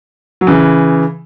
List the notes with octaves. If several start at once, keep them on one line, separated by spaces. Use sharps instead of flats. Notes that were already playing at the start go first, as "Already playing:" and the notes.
F#3
C#3 E3